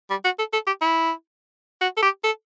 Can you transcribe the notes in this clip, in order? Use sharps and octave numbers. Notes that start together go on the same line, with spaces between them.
G3
F#4
A4
A4
G4
E4
F#4
A4
G4
A4